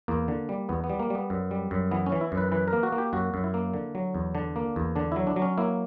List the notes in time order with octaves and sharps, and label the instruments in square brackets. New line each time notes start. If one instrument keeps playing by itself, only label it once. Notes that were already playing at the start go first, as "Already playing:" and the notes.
[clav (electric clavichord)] E2 A#3
D3
G3
E2 B3
B3
G3
A#3
G3 B3
F#2
G3
F#2
E3 B3
C#4
E3
E4
F#2
B4
E3 B4
A#4
A#3
F#4
A#3
G4
F#2 F#4
F#2
E4
A#3
D3
F#3
E2
D3 D4
A#3
E2
D3 D4
F#3 E4
D4
F#3
C#4
A#3 E4